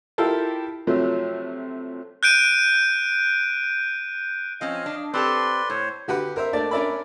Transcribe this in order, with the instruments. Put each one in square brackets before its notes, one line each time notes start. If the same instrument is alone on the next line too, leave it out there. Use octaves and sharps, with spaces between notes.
[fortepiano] E4 F4 G4 A4 A#4
C3 F3 F#3 A3
[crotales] F#6 G6 D7 D#7
[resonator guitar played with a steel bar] F3 C4 C#4 [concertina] D#5 F5
[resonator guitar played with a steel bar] D4
[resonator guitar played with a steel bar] C4 G4 A4 [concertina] B4 D5 C6
[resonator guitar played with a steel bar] A2 [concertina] C5 C#5
[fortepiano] D3 F#4 G4 B4 F#5
A#4 C5 E5
A3 A#3 D4 D5 A5
C#4 D4 A#4 D5 E5 B5